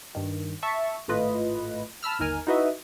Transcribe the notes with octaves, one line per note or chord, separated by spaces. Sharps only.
G2 D#3
E5 A5 C#6
G#1 A2 A3 F4 B4 D#5
A5 B5 E6 F6
G1 D#2 D#4 A#4 G#5 F6
D#4 E4 F#4 B4 D#5 E5